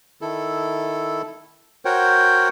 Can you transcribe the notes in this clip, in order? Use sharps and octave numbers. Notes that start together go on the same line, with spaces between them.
D#3 E4 A4
F#4 A#4 C5 C#5 F#5 G5